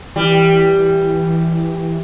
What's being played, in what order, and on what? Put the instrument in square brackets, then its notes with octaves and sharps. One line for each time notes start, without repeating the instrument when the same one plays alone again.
[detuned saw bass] E3 [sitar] G3